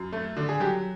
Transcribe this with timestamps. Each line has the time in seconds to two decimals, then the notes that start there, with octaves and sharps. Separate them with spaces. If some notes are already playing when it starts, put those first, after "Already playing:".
Already playing: F#2
0.13 A3
0.37 D3
0.49 G#4
0.60 F#3 G4